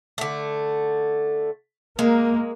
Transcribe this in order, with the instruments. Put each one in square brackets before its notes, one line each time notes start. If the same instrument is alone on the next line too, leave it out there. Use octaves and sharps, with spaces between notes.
[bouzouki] D3 A3
[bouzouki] G#3 [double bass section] A#3